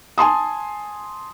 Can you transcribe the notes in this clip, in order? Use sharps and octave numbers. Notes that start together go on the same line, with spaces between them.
G#5 A5 C6 D#6